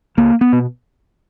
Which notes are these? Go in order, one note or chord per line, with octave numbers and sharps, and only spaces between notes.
C#2 A#3
B3
B2